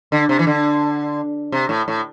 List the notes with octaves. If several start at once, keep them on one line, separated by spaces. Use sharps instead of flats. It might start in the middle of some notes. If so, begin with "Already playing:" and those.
D3
C3
E3
D3
C3
A2
A2